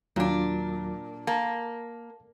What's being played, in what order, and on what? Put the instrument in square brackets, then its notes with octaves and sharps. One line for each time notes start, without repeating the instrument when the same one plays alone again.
[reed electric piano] D#2 F#3 F4 [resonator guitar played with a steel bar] A#2 D4
[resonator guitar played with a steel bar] A#3 [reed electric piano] A5